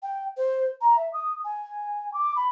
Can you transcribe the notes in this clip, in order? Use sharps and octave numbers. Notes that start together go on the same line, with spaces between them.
G5
C5
A#5
E5
D#6
G#5
D6
B5